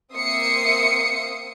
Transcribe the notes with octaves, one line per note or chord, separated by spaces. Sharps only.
A#3 C4 E5 D#6 C7 C#7